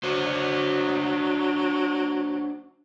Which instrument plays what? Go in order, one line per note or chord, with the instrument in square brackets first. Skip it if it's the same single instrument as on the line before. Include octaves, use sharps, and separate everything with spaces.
[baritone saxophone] F#3 [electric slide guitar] D4 F#4 C5